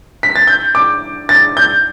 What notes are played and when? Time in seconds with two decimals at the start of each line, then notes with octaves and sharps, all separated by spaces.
0.23 B6
0.36 A6
0.47 G6
0.75 D6
1.29 A6
1.57 G6